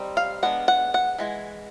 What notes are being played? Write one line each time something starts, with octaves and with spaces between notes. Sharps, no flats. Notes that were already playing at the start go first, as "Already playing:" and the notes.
Already playing: G3 C4 D#4
F5
G#3 B3 D4 F#5
F#5
F#5
E3 G#3